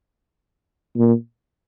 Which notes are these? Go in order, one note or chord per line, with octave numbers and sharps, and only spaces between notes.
A#2